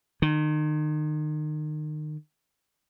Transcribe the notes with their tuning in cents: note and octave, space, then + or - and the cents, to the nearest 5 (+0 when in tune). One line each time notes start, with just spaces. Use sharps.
D#3 -35